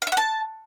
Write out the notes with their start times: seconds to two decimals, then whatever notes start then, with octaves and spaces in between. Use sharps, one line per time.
0.02 F5
0.07 E5
0.12 F#5
0.17 A5